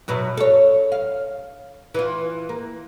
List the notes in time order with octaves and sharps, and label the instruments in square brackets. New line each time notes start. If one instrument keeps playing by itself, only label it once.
[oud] F#2 B2 F#3
A4 C#5
F5
E3 F4
A#3